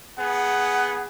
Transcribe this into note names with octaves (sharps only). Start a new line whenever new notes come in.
B3 G#4 F#5